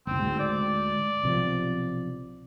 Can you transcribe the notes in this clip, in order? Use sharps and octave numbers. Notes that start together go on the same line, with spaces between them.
F#1 C2 C4
D2 G#2
D5
B1 C3 F3